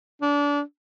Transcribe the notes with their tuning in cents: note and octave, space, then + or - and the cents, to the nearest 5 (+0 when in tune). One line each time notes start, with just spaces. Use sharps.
D4 -25